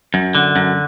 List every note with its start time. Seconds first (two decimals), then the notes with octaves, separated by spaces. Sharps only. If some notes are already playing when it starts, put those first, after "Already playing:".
0.14 F#2
0.35 D3
0.56 F#2